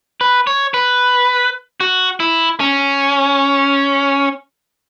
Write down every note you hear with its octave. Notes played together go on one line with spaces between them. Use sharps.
B4
C#5
B4
F#4
E4
C#4